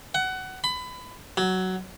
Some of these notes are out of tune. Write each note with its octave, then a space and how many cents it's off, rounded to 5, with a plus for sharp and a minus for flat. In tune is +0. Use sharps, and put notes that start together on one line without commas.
F#5 +20
B5 +25
F#3 +10